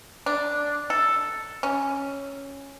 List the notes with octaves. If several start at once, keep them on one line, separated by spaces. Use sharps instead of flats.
D4
A4
C#4